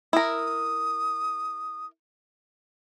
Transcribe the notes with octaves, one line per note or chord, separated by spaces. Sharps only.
E4 A#4 D#6